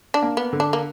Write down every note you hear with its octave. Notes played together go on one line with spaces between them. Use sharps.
D4
A#3
B3
D3
D4
A#3